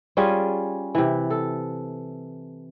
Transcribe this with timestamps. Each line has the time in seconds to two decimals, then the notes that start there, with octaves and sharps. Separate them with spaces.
0.17 G3 C#4 F4 G#4
0.95 C3 E3
1.30 A4